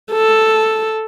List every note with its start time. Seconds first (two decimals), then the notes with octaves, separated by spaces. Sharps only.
0.12 A4